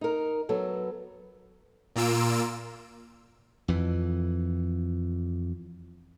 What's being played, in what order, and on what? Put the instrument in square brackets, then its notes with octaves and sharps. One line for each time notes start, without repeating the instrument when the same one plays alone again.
[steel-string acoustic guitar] D#4 A#4
F#3 B3 A4
[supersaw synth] A#2 A#3 F4 E6 D7
[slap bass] F2 E3